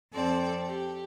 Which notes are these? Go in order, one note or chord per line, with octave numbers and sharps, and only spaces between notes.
F2 C4 A4 D5
G4